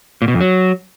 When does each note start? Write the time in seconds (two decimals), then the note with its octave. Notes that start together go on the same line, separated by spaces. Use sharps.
0.22 A#2
0.28 B2
0.34 F2
0.41 F#3